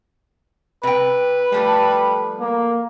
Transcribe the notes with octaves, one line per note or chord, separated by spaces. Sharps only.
C3 B4 G5
F3 G3 A3 A4
A#3